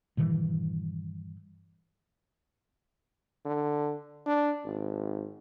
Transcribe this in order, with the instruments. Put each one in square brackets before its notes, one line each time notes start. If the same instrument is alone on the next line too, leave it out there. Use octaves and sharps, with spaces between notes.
[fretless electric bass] G2 A#2 D#3 E3
[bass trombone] D3
D4
G#1